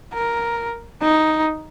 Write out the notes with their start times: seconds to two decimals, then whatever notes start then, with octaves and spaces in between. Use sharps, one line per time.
0.14 A#4
1.02 D#4